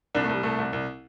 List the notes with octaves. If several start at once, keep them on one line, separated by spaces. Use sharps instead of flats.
C2 D4
A3
C2 G3
C2 A3
C2
C2